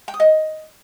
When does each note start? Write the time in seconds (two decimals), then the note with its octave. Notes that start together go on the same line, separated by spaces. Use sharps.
0.08 G5
0.14 D#6
0.20 D#5